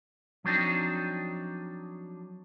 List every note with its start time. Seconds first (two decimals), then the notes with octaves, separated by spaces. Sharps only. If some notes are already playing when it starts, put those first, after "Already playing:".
0.44 F3 F#3 C4 D4 D#4